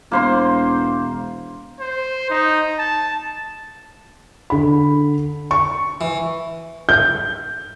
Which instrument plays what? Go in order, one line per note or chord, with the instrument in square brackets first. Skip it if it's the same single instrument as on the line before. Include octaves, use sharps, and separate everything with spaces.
[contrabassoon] E1 [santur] A#3 C5 C6
[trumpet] C5
D#4
A5
[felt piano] D3 B5
C#6
[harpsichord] E3
[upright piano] G6